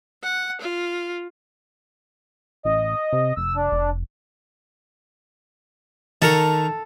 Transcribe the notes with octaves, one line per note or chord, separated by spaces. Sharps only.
F#5
F4
A1 D#5
C3
F1 E6
D4
F1
D#3 A4 A#4 C#6